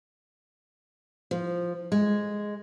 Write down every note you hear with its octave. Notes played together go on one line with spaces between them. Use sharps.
F3
G#3